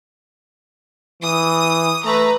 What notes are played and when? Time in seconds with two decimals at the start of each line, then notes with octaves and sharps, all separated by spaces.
1.22 E3 D#6
2.05 A3 B4 A#5